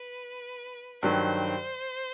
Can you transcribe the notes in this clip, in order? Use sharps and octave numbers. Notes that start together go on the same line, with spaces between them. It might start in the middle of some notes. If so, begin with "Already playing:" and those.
Already playing: B4
G2 D#3 F#3 C5